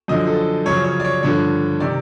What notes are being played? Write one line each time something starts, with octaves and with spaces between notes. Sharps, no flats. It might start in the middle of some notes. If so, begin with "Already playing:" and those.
F#2 D3 F3 D#5
A4
F#2 C#3 F3 C#5
C#5
D5
C#5
G2 D3 F3 C#5
C3 D#3 D5